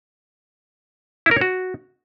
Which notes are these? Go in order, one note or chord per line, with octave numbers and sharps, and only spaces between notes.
E4
A#4
C#5
F#4